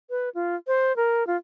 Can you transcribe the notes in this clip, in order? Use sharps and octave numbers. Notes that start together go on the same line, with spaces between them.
B4
F4
C5
A#4
F4